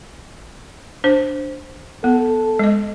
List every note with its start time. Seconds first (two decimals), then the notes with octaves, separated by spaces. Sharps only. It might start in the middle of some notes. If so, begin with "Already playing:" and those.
1.04 D4 C5
2.04 B3 A4
2.59 G#3 D#5